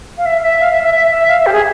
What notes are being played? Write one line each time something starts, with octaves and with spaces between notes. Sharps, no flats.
F5
E5
E5
F5
E5
E5
E5
E5
F5
E5
G4
G#4